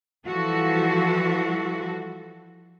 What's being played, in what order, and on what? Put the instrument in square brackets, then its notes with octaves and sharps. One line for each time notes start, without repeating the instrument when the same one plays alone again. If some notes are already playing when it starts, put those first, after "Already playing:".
[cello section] E3 F3 G3 F#4 A4